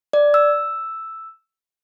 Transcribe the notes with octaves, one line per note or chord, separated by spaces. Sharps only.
D5
E6